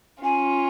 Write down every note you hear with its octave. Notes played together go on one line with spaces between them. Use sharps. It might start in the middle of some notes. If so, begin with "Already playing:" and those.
C#4 F4 G#5